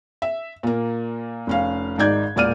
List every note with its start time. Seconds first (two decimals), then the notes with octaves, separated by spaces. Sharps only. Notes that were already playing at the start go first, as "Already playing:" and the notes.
0.22 E5
0.63 A#2 A#3
1.47 F1 C#4 F5
1.98 G#1 G#2 D#4 D5 G6 G#6
2.36 E1 A#2 D5 F6 D#7